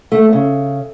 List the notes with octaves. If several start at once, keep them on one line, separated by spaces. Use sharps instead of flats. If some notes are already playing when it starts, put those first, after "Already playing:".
A3
C#3